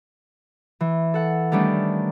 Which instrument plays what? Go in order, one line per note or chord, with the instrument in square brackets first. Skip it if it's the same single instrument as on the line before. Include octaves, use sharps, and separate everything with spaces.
[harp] E3
A4 F#5
D#3 G3 A3 B3 C#4 D4